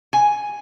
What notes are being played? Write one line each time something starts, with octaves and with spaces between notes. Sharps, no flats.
G#5